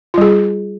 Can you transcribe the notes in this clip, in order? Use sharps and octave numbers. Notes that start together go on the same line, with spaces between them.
G3 F4 G#4